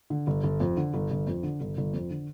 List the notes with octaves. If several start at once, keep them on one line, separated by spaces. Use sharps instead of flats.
D3
G1
G1
F2
D3
G1
G1
F2
D3
G1
G1
F2
D3